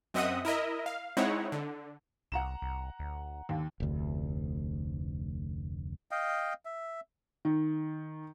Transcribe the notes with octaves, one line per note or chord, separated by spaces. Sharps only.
F#2 C4 D#5 E5 F#5 D#6
E4 A#4 D#5 E5
F5
G#3 C4 D#4 E4 C#5 F#5
D3
C2 F#5 A#5 E7
C2
D2
D#2 D3
F1 D2
D#5 F5 G5
E5
D#3